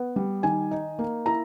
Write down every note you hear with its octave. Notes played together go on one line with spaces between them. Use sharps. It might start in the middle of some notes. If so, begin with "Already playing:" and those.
Already playing: B3
G3
D#3 G#5
D#4
A#3
E4 A#5